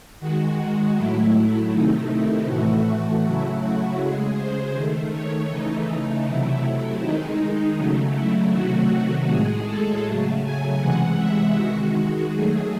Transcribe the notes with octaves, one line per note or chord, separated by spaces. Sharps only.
D#3 G#3 F#4
A2 F#3 A3 E4
E4
C3 D#3 A3 D#4
E4
A2 E3 A3 F#4
C#3 F#3 A3 E4
F#4
C#3 G#3 G#4
C5
D#3 A3
C#5
C#3 E3 A3 D#4
D#4
C3 F#3 A3 E4
E4
D#3 G#3 D#4
C#3 F#3 A3
E4
C3 D#3 F#3 A3 F#4
A2 G#3 G#4
A4
C#3 F#3 A3
G#5
C3 E3 G#3 F#5
E5
D#3 G#3 F#4
D#3 F#3 A3 G#4